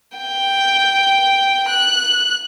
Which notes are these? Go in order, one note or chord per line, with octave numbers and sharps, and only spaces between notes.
G5
F#6